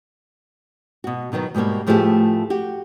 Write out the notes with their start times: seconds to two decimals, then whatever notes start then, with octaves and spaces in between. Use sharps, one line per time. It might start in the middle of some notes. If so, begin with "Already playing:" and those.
1.04 B2 F#4
1.32 B2 D#3 F#3 B3
1.55 G#2 B2 G3 A#3 C#5
1.87 A2 F3 A3 B3 G4 G#4
2.50 F#4 G4